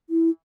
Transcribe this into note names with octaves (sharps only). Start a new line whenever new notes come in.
E4